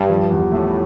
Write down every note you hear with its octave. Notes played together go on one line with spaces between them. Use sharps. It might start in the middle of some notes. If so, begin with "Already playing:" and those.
Already playing: G2 G3
F3
E2
A2 A3